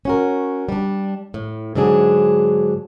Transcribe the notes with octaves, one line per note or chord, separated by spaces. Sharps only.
C#4 F#4 A#4
G3 D4
A2
G#2 D3 F#3 D4 G#4